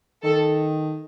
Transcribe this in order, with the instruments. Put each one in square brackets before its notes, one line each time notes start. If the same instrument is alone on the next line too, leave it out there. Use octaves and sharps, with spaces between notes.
[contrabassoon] D#3 [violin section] A4